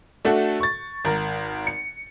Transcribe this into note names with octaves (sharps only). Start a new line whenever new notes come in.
A3 D4 F#4 A4
C#6 A6
G#1 A#4
C#7